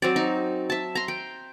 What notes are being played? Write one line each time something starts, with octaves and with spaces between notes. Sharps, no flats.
F#3 C4 D5
D#4
E5 A5
A#5 C6
G5